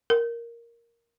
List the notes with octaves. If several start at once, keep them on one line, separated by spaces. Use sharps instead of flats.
A#4